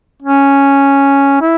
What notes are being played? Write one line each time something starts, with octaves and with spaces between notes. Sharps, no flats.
C#4
E4